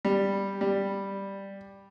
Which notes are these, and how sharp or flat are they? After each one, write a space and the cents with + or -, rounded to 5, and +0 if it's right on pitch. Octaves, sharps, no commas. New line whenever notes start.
G3 +5
G3 +5